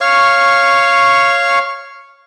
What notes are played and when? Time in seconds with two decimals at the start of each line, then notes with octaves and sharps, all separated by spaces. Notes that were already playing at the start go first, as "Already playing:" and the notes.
0.01 C#5 F5 C#6